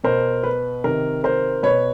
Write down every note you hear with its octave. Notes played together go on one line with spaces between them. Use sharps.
B2 A#4 C5
B4
C3 D#3 A#4
A#4 C5
B2 B4 C#5